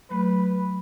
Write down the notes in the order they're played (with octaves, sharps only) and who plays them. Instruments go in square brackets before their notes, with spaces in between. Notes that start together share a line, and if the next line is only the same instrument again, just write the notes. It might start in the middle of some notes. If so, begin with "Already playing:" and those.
[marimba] F#3 A3 [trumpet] B4